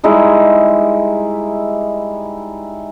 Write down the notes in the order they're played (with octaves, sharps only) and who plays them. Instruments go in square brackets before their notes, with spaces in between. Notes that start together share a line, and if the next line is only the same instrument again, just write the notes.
[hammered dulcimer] G3 G#3 D#4 E4